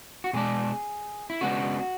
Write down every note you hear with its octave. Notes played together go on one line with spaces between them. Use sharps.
F#4
B2 G#3 D4 G#4
E4
C#3 G#3 B3 D4 F#4